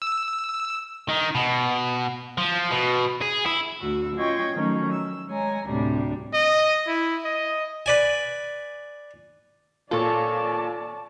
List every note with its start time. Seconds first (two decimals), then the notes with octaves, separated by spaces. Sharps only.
0.02 E6
1.09 D#3
1.35 B2
2.38 F3
2.71 B2
3.22 G#4
3.46 E4
3.79 D2 F#4 E6
4.16 C#4 F4 D#5 G5 C#6 G#6
4.53 D#3 F3 F#3 A3 C#4 D#4
4.91 E6
5.27 G#3 C#5 G#5 A#5
5.66 D2 A2 C3 G3 D4
6.34 D#5
6.87 E4
7.25 D#5
7.86 B4 D5 G#5
9.91 A#2 F4 A4 C#5 D5 A5